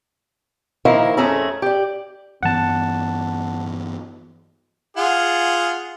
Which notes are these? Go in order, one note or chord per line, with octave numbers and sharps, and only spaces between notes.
D#3 F3 A#3 E4 A#4
F2 A3 C#4 G#4 E5 A#5
G4 D5
G2 E3 B3 F#5 A5
F4 G#4 F#5